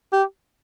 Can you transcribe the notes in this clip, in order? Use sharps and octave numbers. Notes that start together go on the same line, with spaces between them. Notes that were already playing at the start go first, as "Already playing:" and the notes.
G4